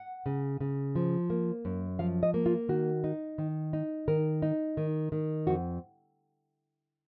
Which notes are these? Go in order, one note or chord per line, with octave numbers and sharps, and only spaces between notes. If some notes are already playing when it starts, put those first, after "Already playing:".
Already playing: F#5
C#3
C#3
F3
A#3
F#2
F3 F5
D#5
A#3
F4
D#3 F#4
D#4
D#3
D#4
D#3 A#4
D#4
D#3
D#3
F2 F#4